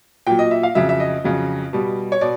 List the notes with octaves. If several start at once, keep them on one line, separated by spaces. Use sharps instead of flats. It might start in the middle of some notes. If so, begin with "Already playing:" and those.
A#2 F#3 G5
D#5
E5
F5
F2 C#3 F#3 E5
E5
D#5
F2 C#3 F#3
B2 G3
C#5
B2 D5